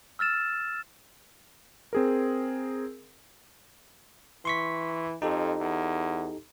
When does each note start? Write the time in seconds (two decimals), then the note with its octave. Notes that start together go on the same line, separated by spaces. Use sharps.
0.19 E6 F6 A6 E7
1.93 C4 G#4 A#4
4.45 E3 C6 C#6 B6
5.22 F2 D#4 G4 A4
5.60 E2